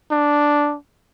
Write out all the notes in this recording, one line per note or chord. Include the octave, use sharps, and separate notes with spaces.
D4